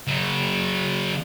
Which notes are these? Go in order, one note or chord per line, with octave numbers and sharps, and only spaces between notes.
C#3 F#3